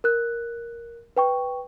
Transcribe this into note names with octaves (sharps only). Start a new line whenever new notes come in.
A#4 F#6
B4 G5 C#6